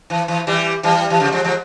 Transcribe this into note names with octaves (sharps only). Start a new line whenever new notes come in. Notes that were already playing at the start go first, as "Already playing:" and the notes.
E3
E3
E3 G3
E3 G3
E3
C#3 F3
F3 G#3
F3 G#3